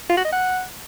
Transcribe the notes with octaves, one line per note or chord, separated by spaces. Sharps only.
F4
F#4
D#5
F#5